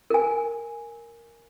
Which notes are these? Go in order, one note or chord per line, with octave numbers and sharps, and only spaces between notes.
A#4 G#5